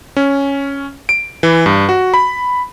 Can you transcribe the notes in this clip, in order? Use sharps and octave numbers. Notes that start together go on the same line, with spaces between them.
C#4
D7
E3
G2
F#4
B5